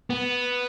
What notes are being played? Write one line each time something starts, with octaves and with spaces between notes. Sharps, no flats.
B3